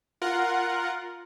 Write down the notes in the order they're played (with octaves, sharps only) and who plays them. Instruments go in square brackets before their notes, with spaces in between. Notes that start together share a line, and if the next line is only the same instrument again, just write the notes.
[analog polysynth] F4 A#4 F#5